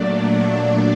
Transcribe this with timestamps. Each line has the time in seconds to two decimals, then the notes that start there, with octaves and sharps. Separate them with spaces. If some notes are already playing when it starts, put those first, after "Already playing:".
Already playing: A#2 F#3 A3 D4 D5
0.14 D4 D5
0.47 D4 D5